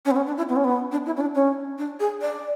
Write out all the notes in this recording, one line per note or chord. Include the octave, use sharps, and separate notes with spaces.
C#4
B3
C#4
D4
E4
B3
C#4
B3
D4
E4
C#4
D4
C#4
D4
G#4
D5